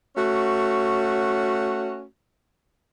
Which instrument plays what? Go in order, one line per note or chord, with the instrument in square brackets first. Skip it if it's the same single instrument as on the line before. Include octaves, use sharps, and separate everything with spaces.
[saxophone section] A3 C#4 F#4